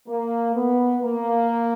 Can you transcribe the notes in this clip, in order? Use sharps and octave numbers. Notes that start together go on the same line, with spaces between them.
A#3
B3
A#3